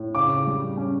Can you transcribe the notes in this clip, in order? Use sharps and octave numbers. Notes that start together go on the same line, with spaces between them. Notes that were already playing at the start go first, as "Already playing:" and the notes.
Already playing: A2
C#3 D6
G3
C#4